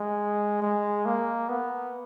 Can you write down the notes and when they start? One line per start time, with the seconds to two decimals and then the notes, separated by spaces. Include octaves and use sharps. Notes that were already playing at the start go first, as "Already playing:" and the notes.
Already playing: G#3
0.62 G#3
1.05 A#3
1.49 B3